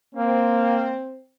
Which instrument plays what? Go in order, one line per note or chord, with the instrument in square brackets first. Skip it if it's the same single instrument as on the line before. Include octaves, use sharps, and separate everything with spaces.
[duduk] A#3 [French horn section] C4